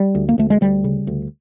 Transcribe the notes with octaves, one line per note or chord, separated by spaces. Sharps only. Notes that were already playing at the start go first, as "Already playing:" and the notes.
Already playing: G3
D2
A#3
D2 A3
G#3
D2 G3
C#3
D2